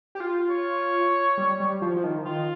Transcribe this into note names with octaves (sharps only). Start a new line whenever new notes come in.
G4
F4
C#5
G3
G3
F3
F3
D#3
F3
D#3 F4